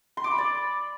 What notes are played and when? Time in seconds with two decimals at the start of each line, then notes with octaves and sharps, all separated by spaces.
0.17 C6
0.24 D6
0.31 B5
0.38 D5